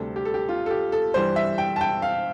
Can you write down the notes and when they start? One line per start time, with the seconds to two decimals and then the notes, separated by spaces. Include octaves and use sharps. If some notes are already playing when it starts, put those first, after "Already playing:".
Already playing: D2 C3 G3 C4 A4
0.16 G4
0.25 A4
0.34 G4
0.49 F4
0.66 A4
0.71 G4
0.92 A4
1.14 G2 E3 G3 C5
1.36 E5
1.58 G5
1.76 A5
1.81 G5
2.02 F5